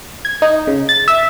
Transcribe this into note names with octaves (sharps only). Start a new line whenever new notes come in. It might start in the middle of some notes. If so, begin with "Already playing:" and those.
G#6
D#4
C#3
A6
E5